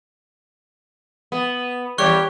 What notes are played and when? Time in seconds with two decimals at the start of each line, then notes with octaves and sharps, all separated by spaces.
1.32 B3
1.98 E2 G3 G4 C#5 C#6 F#6